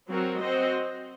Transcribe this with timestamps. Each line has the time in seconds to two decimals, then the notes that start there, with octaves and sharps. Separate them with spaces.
0.09 F#3 C4 F#4 A#4
0.41 C4 F#4 C5 D#5